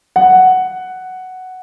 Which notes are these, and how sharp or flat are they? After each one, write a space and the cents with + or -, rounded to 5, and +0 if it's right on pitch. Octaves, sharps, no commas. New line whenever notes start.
F#5 +5